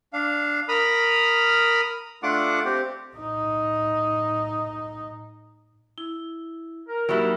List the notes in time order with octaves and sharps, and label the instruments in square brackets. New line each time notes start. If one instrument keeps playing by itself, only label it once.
[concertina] D4 F5
A#4 B5 D#6 F6
A3 D4 F4 F#5 D6
C4 G4
[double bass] A2 D#4
[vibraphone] E4
[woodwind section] A#4
[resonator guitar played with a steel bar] F#3 G3 E4 [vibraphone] A#3 D#4